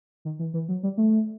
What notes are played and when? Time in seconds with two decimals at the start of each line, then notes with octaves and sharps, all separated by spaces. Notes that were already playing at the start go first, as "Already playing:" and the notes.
0.25 D#3
0.39 E3
0.54 E3
0.69 F#3
0.83 G3
0.97 A3